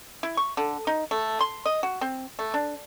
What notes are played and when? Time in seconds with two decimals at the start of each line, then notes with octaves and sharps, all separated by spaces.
0.23 E4
0.37 C#6
0.57 D3
0.87 D#4
1.11 A3
1.41 C6
1.66 D#5
1.83 F#4
2.01 C4
2.39 A3
2.54 D4